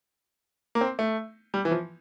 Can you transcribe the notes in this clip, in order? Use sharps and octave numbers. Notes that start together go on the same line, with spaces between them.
A#3
C4
A3
G3
E3
F3